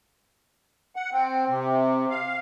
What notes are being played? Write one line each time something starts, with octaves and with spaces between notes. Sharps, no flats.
F#5
C4
C3
F5